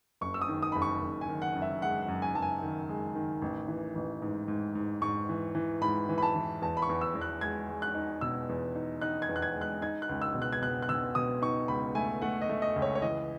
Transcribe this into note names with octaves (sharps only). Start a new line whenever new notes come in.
F#1 C#6
E6
D#6
D#3
D#6
F#1 B5
C#6
F#1
G#5
D#3
F#5
F#2
E5
G#3 F#5
F#5
F#2
G#5
F#2 A5
G#5
D#3
G#3
D#3
A1
E3
A1
G#2
G#2
G#2
G#2 C#6
E3
E3
G#2 B5
E3
B5
A5
E3
E2 A5
B5
C#6
E2
E6
E2
F#6
G#3 G#6
G#3
F#6
D#4
B2 E6
E2
D#4
D#4 F#6
G#6
E2
F#6
G#6
G#3
F#6
D#4 G#6
F#6
C#2
E6
B2
F#6
G#6
B2 F#6
F#6
B2 E6
B2 D#6
D#4 C#6
C#2 B5
A3 G#5
A3 F#5
D#5
A3
D#5
C#2
C#5
C#5
E3 D#5